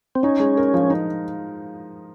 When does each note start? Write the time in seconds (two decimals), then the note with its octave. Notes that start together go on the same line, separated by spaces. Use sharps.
0.15 C4
0.23 C#4 D#4
0.40 G#3
0.57 A#4
0.74 F3
0.90 D#4